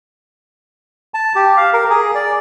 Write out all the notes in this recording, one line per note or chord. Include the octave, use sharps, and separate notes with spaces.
A5
G4
F5
A#4
G#4
D5